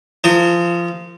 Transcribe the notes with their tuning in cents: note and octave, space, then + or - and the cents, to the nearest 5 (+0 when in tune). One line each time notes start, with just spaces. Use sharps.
F3 -20 A#4 -45 D#6 +0